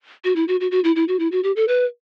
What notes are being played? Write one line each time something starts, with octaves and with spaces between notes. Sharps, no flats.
F#4
E4
F#4
F#4
F#4
E4
E4
F#4
E4
F#4
G4
A4
B4